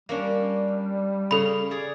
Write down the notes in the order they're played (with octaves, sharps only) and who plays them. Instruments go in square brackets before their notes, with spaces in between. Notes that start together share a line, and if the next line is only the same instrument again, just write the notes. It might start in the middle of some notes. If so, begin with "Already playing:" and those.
[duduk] G3 [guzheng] A#3 C#4 D4
[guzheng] C#3 [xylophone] A4 B5
[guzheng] G#4 D5